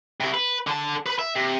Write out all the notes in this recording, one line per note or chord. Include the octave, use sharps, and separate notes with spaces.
C3 E4
B4
D3 A5
B4 B5
E5
C3